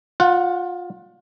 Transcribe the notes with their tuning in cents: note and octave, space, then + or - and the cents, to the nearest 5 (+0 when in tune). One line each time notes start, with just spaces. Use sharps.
F4 +25 F#5 +0